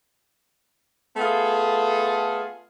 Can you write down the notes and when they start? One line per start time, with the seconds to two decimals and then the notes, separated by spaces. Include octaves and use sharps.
1.17 A3 B3 F4 G#4 A4